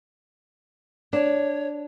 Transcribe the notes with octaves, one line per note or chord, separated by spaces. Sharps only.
D4 C#5